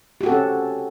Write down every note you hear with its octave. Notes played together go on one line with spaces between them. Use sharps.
C4 C#4 F#4 G4 A4